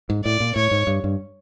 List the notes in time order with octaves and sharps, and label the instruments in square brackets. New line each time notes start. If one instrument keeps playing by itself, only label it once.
[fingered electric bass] G#2
[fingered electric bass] A2 [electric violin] D5
[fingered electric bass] A#2
[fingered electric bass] A2 [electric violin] C#5
[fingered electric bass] G#2
G2
G2